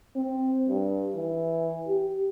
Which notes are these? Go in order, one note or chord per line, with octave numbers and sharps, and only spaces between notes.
C4
G2
E3
G4